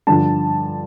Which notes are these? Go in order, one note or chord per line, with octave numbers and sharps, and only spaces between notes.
G2 D3 F3 A5